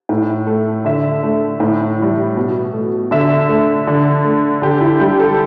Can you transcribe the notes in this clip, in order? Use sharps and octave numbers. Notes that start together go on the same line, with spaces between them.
A2
A3
D3 E5
A3
A2
E3 G3
B2
A3
D3 E5
A3
D3
A3
D3 G4
E4
G3 G4
A4